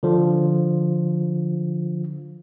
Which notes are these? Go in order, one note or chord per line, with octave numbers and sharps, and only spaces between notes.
D3 F3